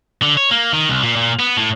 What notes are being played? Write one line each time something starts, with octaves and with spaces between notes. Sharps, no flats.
D3
C#5
A#3
D#3
C2
A#2
A#2
B3
A2